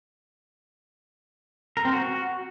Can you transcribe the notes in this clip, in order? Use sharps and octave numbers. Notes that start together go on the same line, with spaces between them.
A#4
C4
F#4